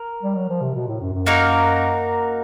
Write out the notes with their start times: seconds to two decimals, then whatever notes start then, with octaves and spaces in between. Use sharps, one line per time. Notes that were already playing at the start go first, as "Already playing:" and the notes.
Already playing: A#4
0.23 G3
0.35 F#3
0.49 F3
0.61 C3
0.75 B2
0.88 A2
1.00 F#2
1.13 F#2
1.26 A#3 D#4 F#4 A#4